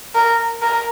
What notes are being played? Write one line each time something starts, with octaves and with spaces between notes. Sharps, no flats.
A#4
A#4